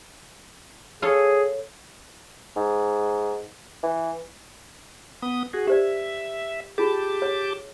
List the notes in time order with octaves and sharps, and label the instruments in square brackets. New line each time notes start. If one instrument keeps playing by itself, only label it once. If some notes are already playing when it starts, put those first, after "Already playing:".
[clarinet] G#4 [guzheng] A4 C#5 F5
[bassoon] G#2
E3
[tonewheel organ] B3 D#6
F#4 G#4
[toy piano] G4 C5 D5 [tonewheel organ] E5
[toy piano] F4 G#4 [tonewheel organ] G4 A5 D6
[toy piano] C#5